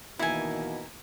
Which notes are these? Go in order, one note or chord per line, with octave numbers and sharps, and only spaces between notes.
B2 D#3 E3 A#3 D#4 E4 G#5